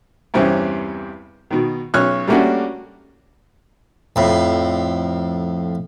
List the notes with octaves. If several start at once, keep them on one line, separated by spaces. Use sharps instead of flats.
E2 G2 C3 C4 C#4
B2 D#3
B1 C#4 C#5 F6 F#6
G3 A3 A#3 C#4 D4 F#4
F2 A2